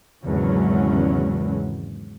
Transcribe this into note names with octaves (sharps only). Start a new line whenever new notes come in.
G#1 E2 C#3 F#3 C#4